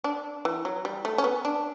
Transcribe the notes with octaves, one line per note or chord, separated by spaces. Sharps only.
D4
E3
F#3
G3
A3
C#4
B3
D4